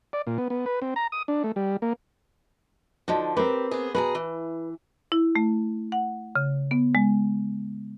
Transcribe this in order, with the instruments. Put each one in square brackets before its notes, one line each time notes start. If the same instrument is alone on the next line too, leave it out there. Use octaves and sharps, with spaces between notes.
[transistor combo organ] D5
A#2
B3
B3
B4
C4
A#5
D#6
D4
A3
G3
A#3
[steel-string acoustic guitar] D3 F3 [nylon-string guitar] D#4 F#4
[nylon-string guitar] C4 A#4 B4 [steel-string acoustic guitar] G4
[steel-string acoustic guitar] B3 G#4
[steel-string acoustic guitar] B2 G#4 A#5 [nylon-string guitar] B4
[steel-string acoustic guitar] E3
[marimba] E4
A3
F#5
C#3
B3
G#3